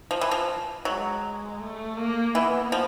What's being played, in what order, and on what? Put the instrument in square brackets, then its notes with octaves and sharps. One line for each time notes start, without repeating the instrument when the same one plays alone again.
[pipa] F3
E3
F3
[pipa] F#3 [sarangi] G#3
[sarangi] A3
A#3
[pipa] E3 [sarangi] B3
[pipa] F3